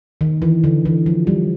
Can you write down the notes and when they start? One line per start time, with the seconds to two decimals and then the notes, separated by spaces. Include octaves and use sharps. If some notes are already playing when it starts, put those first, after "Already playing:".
0.21 D#3
0.42 E3
0.64 D3
0.85 E3
1.06 F3
1.27 G3